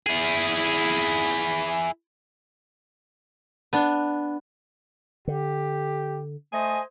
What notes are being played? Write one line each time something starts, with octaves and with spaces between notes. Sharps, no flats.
E4 G#4
B3 D4
D3 G4
A3 C5 D#5 G#5